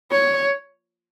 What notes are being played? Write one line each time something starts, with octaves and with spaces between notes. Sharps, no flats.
C#5